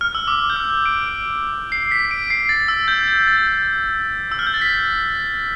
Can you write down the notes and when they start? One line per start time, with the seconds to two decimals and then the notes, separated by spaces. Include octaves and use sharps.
0.01 F6
0.15 E6
0.28 D6
0.50 G6
0.56 F6
0.86 D7
1.08 D7
1.72 C7
1.92 B6
2.11 D7
2.30 C7
2.49 A6
2.68 E6
2.88 G6
3.08 G6
3.27 A6
3.36 G6
3.47 A6
4.32 E6
4.39 F6
4.47 G6
4.54 A6
4.62 B6